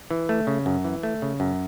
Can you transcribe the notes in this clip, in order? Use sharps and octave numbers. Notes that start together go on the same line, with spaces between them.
E3
A3
C#3
F#2
E3
A3
C#3
F#2